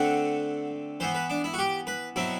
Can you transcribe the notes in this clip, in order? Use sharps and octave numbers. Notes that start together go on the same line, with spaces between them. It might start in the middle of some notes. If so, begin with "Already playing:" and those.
Already playing: D3 A3 C4 F#5
E3 B3 C5
B4
D4
E4
F#4
G4
B4
B2 F#3 C4 E4